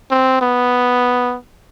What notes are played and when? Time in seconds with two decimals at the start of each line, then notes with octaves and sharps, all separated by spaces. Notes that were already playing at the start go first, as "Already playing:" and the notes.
0.11 C4
0.41 B3